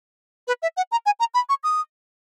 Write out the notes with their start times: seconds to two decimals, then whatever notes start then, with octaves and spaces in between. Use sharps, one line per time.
0.48 B4
0.62 E5
0.77 F#5
0.92 A#5
1.06 G#5
1.20 A#5
1.34 B5
1.49 C#6
1.64 D#6